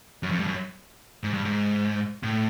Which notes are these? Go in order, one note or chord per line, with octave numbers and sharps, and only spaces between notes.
F#2
F2
G2
F#2
G#2
G2
G#2
A2